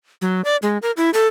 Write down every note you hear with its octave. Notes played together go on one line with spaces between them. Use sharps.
F#3
D5
G#3
A#4
E4
A4